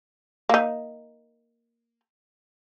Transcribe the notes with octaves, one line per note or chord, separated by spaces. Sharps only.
A#3 D#4